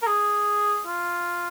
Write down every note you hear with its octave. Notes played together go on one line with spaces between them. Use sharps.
A#4
G#4
F4